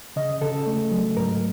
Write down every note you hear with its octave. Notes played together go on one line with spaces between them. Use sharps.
C#3 D#5
C#3 A4
A3
F#3
G#2 A#4